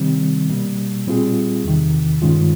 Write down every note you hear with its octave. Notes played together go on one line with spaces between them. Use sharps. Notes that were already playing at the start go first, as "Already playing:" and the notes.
Already playing: C3 D#3 G3 C4
B2 G3 A#3
A#2 G3 C4 F4 G#4
E2 C3 D#3
G2 D#3 G#3 C#4 F4